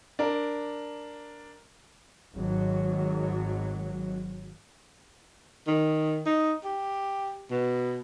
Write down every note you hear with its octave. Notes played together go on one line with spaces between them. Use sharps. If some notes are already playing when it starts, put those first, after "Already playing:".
D4 A#4
G#1 F#3
D#3
D#4
G4
B2